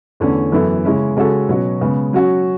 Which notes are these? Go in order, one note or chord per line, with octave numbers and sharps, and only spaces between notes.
E2 D3 A3 C#4
F#2 E3 B3 E4 A4
C#3 G#3 C#4 E4
C#3 G#3 C#4 F#4 A4
B2 F#3 C#4 F#4
C#3 G#3 B3
F#3 C#4 F#4